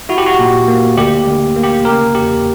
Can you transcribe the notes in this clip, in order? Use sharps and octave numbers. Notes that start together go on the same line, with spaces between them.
E4 F#4
G4
F#4
A#2
A#3
D2 G4
D2
A#3
G4
C#3 A#4
E2 G4